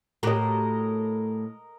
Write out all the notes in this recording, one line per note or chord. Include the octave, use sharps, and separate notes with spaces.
A2 F#4 G4 A#4 D#5